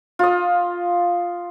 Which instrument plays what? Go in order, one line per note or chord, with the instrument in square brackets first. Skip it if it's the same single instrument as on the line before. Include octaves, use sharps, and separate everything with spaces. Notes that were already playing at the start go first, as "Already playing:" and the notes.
[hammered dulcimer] F4 D#5